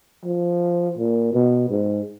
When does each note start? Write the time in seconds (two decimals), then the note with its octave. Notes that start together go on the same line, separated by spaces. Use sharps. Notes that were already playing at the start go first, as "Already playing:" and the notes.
0.25 F3
0.98 A#2
1.33 B2
1.70 G#2